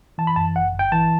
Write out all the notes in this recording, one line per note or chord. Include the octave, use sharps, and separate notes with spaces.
E3 A5
B5
F#2 A5
G1 F#5
G1
G5
E3 A5